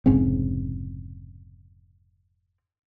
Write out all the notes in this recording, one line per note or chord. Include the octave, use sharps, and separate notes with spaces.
F1 G#2 C#3 C4